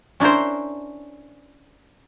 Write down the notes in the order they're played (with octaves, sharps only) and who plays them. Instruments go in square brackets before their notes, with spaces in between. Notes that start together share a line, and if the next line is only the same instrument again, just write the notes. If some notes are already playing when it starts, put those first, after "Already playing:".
[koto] C#4 D4 E4 A#4 C5